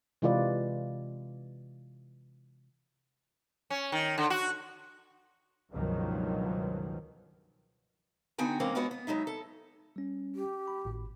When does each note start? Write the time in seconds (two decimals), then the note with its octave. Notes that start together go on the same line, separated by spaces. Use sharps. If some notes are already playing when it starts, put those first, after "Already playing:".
0.22 C3 E3 G#3 F4 B4 D5
3.70 C#4
3.92 D#3
4.18 D3
4.30 F#4
5.72 C#2 G2 B2 D#3 F3 F#3
8.38 D3 B3 D#4 F#4 G5 G#5
8.60 E3 G#3 A#3 C4 C#4
8.75 G#3 B3 F4 F#4 B4 C#5
8.91 B3
9.07 F#3 G#3 D#4 E5
9.27 A4
9.96 G3 C#4
10.35 G4
10.68 B5
10.85 G#1 A2